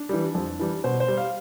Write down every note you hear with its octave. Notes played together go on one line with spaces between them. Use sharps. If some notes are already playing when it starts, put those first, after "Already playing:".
Already playing: D4
E3 G3
F2
E3 G3
B2 C5
C5
G3
F5